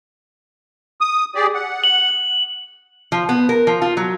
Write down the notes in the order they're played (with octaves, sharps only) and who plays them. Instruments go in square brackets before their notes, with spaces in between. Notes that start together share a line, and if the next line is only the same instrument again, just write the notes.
[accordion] D#6
G4 G#4 D5
F#5
[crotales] F#7
[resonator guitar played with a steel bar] F3
B3
A#4
F3
F4
F#3